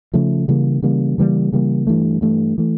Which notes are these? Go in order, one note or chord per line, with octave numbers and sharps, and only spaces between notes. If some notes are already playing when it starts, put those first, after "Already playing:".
C#3 F3 A3
C#3 E3 G3 A#3
C#3 E3 G3 A#3
C#3 E3 G3 A#3
C#3 E3 G3 A#3
G2 E3 A3
G2 E3 A3
E3 A3